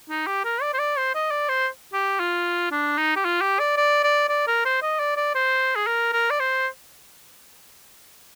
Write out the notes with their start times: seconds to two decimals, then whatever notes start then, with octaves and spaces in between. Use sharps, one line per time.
0.09 D#4
0.27 G4
0.45 A#4
0.62 D5
0.74 C5
0.79 D5
0.97 C5
1.15 D#5
1.31 D5
1.49 C5
1.93 G4
2.20 F4
2.71 D4
2.98 D#4
3.16 G4
3.25 F4
3.41 G4
3.59 D5
3.77 D5
4.04 D5
4.29 D5
4.47 A#4
4.65 C5
4.82 D#5
4.99 D5
5.16 D5
5.35 C5
5.76 G#4
5.87 A#4
6.13 A#4
6.30 D5
6.40 C5